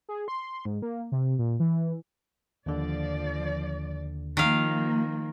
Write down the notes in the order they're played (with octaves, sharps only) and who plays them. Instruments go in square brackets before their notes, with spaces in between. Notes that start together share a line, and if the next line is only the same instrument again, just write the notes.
[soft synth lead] G#4
C6
G#2
A#3
C3
A#2
E3
[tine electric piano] D#2 D3 [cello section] F3 D5
[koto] D#3 F5 [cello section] F3 A#3